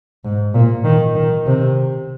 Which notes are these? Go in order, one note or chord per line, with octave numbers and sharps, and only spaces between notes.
G#2
A#2
D#3
D#3
C3